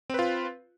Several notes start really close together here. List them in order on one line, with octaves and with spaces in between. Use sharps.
C4 B4 F4